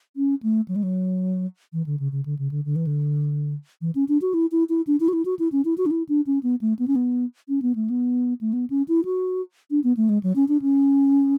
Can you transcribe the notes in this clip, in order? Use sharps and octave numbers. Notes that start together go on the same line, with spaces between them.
C#4
A3
F#3
G#3
F#3
E3
D3
C#3
C#3
D3
C#3
D3
D3
E3
D3
E3
C#4
D4
F#4
E4
E4
E4
D4
E4
F#4
E4
F#4
E4
C#4
E4
F#4
D4
E4
D4
C#4
B3
A3
B3
C#4
B3
C#4
B3
A3
B3
A3
B3
C#4
E4
F#4
D4
B3
A3
G#3
F#3
C#4
D4
C#4